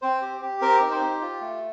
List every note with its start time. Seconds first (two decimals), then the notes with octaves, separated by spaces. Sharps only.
0.02 C4 C5
0.22 G4
0.41 G4
0.61 C4 A#4
0.81 D#4
0.91 C5
1.02 G4
1.22 F4
1.41 A3